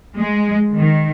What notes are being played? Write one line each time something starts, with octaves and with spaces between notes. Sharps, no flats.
G#3
D#3